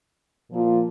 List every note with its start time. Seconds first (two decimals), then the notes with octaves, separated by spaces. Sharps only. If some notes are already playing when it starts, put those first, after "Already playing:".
0.51 A#2 F3 A#3 F4